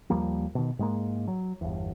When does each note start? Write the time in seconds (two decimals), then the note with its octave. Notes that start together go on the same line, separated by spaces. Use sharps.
0.10 D#2 F3 G3 A#3
0.55 B2 D#3
0.79 G#2 G#3 A#3
1.27 F#3
1.61 G1 E2